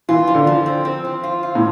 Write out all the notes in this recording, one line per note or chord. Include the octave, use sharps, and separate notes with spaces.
E3 F4
F3
D3
F3
C4
C4
F3
F4
F4
A2